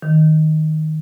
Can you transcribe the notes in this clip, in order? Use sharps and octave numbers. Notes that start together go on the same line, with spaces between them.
D#3